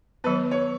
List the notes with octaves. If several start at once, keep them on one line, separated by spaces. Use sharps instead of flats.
D#3 F#3 B3 B4
C#5